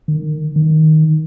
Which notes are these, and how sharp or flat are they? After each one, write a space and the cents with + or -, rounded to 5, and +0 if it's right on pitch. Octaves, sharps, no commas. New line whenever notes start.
D#3 -20
D#3 +5